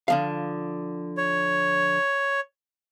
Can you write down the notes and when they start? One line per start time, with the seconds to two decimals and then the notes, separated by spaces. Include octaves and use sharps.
0.08 D3 F3 F5
1.18 C#5